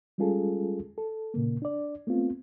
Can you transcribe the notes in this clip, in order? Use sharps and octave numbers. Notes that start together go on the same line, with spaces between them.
G3 G#3 C#4 F4 G#4 A4
A4
A#2 C#3 A#3
D4 D5
A3 B3 C4 F4